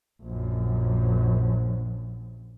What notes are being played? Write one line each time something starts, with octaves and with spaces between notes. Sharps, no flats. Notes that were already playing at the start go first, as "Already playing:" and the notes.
A#1 F#2